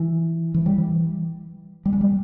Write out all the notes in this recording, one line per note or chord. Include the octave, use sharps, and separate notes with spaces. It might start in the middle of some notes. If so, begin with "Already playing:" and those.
Already playing: E3
E3
G3
E3
G3
G#3
G3